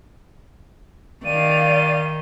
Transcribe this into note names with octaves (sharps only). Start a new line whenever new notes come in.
D#3 D5 F5 D#7